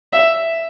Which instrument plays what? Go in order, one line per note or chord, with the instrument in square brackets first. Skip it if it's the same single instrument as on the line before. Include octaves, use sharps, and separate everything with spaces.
[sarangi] E5